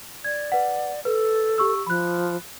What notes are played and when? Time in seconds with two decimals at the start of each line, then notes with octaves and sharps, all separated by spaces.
0.24 D5 G#6
0.52 B4 F#5
1.05 A4 B4
1.58 G4 C#6 E6
1.87 F3 B5 F#6